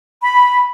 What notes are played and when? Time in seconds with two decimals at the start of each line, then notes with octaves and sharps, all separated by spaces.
0.21 B5